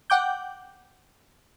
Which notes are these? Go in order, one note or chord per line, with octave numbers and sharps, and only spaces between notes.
F#5 G5 D6 G6